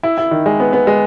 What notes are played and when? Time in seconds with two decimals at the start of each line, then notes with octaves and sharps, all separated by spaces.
0.03 E4
0.18 E4
0.31 D#3
0.46 G#3
0.60 B3
0.73 B3
0.87 G#3